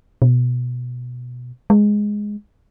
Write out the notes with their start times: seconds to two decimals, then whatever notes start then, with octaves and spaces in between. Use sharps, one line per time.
0.22 B2
1.70 G#3